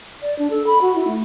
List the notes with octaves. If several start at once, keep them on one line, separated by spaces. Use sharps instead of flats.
D5
D4
A4
B5
F#4
E4
A3